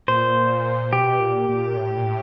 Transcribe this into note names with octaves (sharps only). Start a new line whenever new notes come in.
A#2 C5
B2 G4
A#2
A#2
A2
A#2
A2